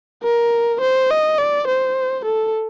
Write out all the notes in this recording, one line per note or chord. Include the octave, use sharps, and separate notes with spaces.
A#4
C5
D#5
D5
C5
A4